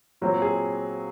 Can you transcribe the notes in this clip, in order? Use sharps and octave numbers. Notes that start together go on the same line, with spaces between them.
A#2 F#3 C4
G#4